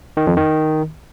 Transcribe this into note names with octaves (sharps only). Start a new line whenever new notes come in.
D#3
F2
D#3